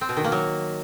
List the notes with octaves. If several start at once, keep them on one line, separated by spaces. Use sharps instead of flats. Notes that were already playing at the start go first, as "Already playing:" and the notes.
C4
B2
D#3
A#3
F#3